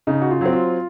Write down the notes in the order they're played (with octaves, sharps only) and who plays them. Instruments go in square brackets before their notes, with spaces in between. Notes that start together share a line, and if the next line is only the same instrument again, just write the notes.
[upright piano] C#3 [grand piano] D#4
[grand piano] F#4
F4
[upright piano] F#3 C4
[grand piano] F4